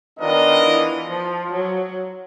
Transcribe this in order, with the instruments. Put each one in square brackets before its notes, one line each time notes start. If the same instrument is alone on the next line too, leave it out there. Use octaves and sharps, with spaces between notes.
[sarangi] D#3 [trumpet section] B3 D4 F4 A#4 D#5
[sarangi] E3
F3
F#3